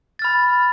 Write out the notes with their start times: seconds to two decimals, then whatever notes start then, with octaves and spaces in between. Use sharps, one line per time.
0.19 A6
0.22 F6
0.25 B5